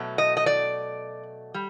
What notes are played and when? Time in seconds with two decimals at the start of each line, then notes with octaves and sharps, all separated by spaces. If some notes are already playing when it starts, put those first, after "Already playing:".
Already playing: B2 F#3 A3
0.18 D#5
0.37 D#5
0.46 D5
1.54 G3